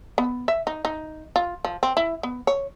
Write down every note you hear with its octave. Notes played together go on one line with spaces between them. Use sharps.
B3
E5
D#4
D#4
F4
F3
C4
E4
B3
C#5